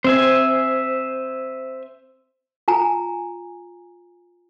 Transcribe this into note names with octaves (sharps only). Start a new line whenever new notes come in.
C4 C5 E5 G#5
F4 G#5 A#5